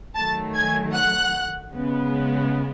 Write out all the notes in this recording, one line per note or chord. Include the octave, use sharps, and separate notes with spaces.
D#3 F#3 A3 A5 A6
G#5 G#6
F#5 F#6
C#3 G#3 B3